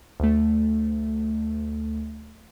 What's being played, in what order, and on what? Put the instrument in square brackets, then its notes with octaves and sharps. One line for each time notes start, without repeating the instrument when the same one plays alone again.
[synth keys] D2 A3